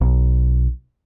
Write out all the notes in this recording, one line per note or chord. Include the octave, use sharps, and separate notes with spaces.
B1